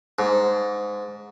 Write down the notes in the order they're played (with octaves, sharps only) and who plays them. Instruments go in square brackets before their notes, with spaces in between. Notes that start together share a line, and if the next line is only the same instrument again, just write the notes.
[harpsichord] G#2